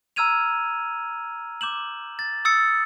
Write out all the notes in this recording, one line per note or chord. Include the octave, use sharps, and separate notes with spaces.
A#5 E6 F6 G#6 D#7 F7
D6 G6 E7 F#7
A6
D#6 E6 A6 C#7